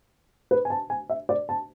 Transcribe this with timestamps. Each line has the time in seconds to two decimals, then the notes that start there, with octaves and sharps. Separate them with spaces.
0.51 B4
0.65 G#5
0.70 A5
0.90 G#5
1.10 E5
1.29 D5
1.49 A5